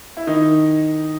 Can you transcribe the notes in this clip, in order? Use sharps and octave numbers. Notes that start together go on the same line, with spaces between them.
E4
D#3 D#4